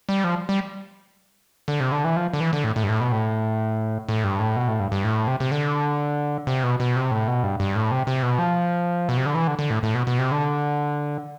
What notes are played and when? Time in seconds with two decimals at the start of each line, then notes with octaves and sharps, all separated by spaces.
0.09 G3
0.24 F3
0.49 G3
1.68 D3
1.80 C3
1.92 D3
2.04 E3
2.16 F3
2.33 D3
2.40 E3
2.53 D3
2.64 A2
2.76 A2
2.84 G2
2.89 A2
3.01 B2
3.12 A2
4.09 A2
4.24 G2
4.40 A2
4.56 B2
4.68 A2
4.80 G2
4.92 G2
5.04 A2
5.27 C3
5.40 C3
5.51 D3
6.47 C3
6.63 B2
6.80 B2
6.96 C3
7.11 A2
7.28 B2
7.43 G2
7.60 G2
7.75 A2
7.91 C3
8.07 C3
8.23 B2
8.39 F3
9.09 B2
9.17 C3
9.26 D3
9.35 E3
9.47 D3
9.59 D3
9.70 A2
9.83 A2
9.95 B2
10.07 B2
10.18 C3
10.31 D3